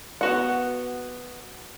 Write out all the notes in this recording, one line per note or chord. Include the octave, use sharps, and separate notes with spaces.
B3 F#4 F#5